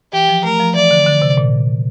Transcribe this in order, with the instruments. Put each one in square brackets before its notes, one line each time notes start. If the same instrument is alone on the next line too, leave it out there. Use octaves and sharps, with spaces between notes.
[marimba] E3 [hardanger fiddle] G4
[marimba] F3
[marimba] A3 [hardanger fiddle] A#4
[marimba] F3
[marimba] E3 [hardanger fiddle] D5
[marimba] D3
D3
C3
A#2